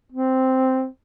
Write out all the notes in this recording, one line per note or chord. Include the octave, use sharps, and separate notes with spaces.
C4